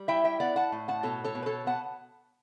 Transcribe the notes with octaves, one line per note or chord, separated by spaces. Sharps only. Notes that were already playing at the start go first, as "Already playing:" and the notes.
Already playing: G3
E4 E5 G5
E5 G5
B3 D5 F#5
F#5 A5
A2
F#5 A5
B2 A4 C#5
A4 C#5
B2
B4
A4 C#5
B3 F#5 A5